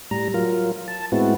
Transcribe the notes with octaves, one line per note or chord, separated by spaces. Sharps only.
A2 G3 A#5
F#3 F4 A#4
A5
A2 G#3 B3 C4 E4 F#4